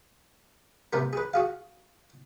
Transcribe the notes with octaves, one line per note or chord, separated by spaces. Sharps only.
C3 A3 B3 A#4
G#4 B4
F#4 G#4 F5